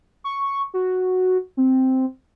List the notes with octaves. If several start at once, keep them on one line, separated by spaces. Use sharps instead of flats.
C#6
F#4
C4